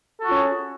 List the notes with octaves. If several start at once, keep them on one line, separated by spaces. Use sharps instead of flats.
C#4 F4 F#4 G#4 A4